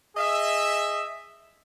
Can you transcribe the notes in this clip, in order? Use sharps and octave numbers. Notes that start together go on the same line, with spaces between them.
G#4 D#5 E5